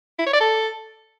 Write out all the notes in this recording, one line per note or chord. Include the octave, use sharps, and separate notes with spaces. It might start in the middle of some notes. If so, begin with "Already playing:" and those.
E4
C#5
D5
A4